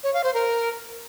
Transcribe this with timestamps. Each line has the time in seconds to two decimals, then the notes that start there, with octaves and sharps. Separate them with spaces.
0.04 C#5
0.14 F5
0.24 C5
0.34 A#4